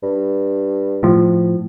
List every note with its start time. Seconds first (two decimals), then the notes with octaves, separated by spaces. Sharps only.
0.03 G2
1.03 A2 F3